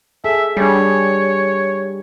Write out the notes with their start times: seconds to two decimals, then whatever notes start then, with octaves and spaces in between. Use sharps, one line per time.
0.24 G#4 A4 E5
0.57 G3 D4 G#4 C#5